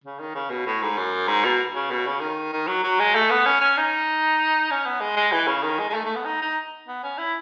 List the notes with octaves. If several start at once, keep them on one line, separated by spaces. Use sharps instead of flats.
C#3
D#3
C#3
B2
A2
G#2
F#2
G#2
B2
C#3
B2
C#3
D#3
D#3
F#3
F#3
G#3
A3
B3
C#4
C#4
D#4
C#4
B3
G#3
G#3
E3
C#3
D#3
G#3
G#3
A3
A3
B3
D#4
D#4
B3
C#4
E4